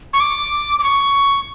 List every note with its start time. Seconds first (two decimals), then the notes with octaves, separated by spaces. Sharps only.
0.13 C#6
0.20 D6
0.79 D6
0.83 C#6